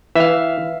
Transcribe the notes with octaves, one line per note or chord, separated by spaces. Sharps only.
E3 E5 F5